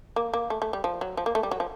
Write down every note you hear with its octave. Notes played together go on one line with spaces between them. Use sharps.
A#3
A#3
A3
A3
G3
F3
F#3
F3
A#3
A3
G3
F#3
F3